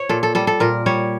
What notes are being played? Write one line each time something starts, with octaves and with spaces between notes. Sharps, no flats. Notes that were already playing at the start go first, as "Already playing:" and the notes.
Already playing: C#5
A#2 A4
A4
G3 A4
A4
A#2 A#4
G3 C#5